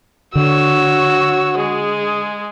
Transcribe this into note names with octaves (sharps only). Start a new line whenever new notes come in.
D3 F#4 C#5 E6
G#3 G#4